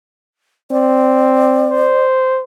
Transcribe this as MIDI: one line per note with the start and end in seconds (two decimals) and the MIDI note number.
0.71 1.95 60
0.71 2.06 74
1.71 2.43 72